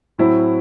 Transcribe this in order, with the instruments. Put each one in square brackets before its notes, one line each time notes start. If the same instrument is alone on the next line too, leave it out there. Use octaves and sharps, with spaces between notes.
[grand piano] A2 F#3 C4 E4